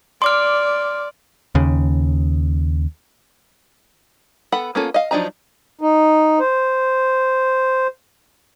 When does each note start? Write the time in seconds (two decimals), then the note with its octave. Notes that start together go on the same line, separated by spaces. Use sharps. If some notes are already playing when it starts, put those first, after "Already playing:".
0.22 D5 C6 D6 F6
1.55 D#2 C#3
4.52 B3 A4 F#5 B5
4.75 A#3 B3 C#4 F4 A4
4.94 D#5 F5
5.11 F3 F#3 D4 D#4 A#5
5.81 D#4
6.40 C5